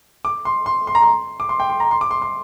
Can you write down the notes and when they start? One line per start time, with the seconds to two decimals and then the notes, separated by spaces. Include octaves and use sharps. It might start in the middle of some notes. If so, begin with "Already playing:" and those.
0.25 D6
0.45 C6
0.66 C6
0.87 C6
0.95 A#5
1.02 C6
1.40 D6
1.49 C6
1.60 G5
1.70 C6
1.80 A#5
1.91 C6
2.01 D6
2.11 C6
2.22 C6